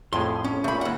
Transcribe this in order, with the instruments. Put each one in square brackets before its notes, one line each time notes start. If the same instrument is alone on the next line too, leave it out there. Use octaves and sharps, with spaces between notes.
[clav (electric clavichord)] F2 A2 G#4 [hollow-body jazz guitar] C6
[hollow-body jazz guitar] C#4
[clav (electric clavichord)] A#2 C#3 [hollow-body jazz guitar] A3 B5
[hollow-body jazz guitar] D#2 F#5